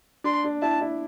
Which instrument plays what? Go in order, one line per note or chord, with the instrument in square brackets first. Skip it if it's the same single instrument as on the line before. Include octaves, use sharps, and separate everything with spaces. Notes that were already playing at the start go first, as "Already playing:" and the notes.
[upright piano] D4 [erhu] C6
[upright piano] D4
[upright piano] E4 [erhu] A5
[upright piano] E4